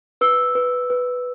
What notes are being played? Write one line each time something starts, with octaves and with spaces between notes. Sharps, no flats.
B4 E6
B4
B4